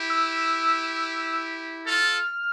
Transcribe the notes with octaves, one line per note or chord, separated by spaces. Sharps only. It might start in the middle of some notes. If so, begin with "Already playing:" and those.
Already playing: E4 G4
E6
F4 A4 F6